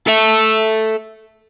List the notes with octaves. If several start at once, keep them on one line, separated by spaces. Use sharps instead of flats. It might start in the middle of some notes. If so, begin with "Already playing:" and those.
A4 E5